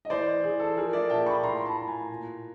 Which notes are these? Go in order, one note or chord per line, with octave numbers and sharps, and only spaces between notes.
D#5
E3 C5 D5
E3 G#4
A4
F3 G#4 A#4
D5 E5
A#2 G5 A5
B5 C#6
A2 A#5 C6
A5 B5
A2 A5
G#5 A#5
A#2